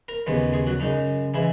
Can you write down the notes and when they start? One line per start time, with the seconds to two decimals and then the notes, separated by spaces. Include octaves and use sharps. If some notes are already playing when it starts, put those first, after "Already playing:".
0.08 A#4 A#5
0.27 D#2 C#3 G#3 B3
0.53 G#3 G#4
0.67 F#3 F#4
0.80 F#2 C#3 G#3 D#4
1.34 C#3 E3 G#3 E4